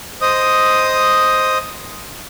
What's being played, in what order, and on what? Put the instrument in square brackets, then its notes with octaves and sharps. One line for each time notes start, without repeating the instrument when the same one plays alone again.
[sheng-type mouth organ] C5 D#5 D#6